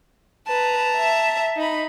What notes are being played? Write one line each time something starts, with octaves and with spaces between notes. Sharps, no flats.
B4 A5 A#5
E5
D#4 B5